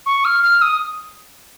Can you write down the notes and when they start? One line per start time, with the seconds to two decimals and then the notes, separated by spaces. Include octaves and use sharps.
0.06 C#6
0.25 F6
0.43 F6
0.62 D#6